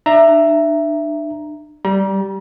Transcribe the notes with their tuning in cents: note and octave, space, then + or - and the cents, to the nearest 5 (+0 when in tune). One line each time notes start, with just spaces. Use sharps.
D4 +35 E5 +10 A#5 +0
G3 -10 A#5 +40